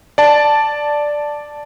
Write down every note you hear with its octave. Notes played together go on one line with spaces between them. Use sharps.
D5 A5